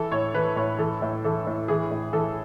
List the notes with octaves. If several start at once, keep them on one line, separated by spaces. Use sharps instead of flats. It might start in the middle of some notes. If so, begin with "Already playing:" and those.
Already playing: E3 A4
A2 C#5
E3 B4
A2 C#5
E3 A4
A2
E3 A4
A2
E3 G#4
A2
E3 A4